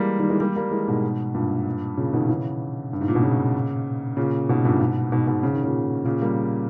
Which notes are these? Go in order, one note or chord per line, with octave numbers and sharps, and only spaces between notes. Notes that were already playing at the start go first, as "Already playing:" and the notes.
Already playing: E3 G3 G#3 A#3
D#3 G3
E3 G#3
G3 A#3
G3 A#3
E3 G#3
G#2 B2
G2 A#2
A#2 C#3
B2 D#3
C#3 E3
G2
G#2
A#2
B2
A#2 C#3
A#2 C#3
G#2 B2
G2 A#2
G#2 B2
G#2 B2
G#2 B2
C#3
D#3
A#2 C#3
A#2 C#3
G3 A#3